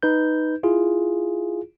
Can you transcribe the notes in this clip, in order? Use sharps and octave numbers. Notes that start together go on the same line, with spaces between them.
D#4 B4 G6
E4 F4 G#4